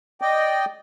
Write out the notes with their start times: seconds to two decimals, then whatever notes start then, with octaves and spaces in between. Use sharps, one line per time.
0.21 D5 D#5 G5